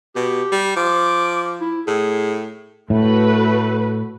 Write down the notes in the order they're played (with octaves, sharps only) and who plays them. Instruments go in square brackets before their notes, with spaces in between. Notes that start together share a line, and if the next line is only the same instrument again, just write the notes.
[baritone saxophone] B2 [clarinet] G4
[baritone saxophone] G3
[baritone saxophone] F3 [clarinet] D6
[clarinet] E4
[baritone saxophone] A2 [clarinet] G#4
[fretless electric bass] A2 [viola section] A3 F#4 B4